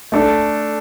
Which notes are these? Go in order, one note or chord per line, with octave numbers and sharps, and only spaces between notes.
A3 D4 A4